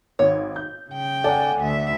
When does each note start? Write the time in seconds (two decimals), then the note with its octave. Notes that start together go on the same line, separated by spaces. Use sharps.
0.19 G#1 C#5
0.56 G6
0.90 C#3 G5
1.24 A4 D5 F#5 G#5
1.58 D2 E5